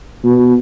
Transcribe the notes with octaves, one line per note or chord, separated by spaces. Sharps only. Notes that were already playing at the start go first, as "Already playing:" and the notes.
B2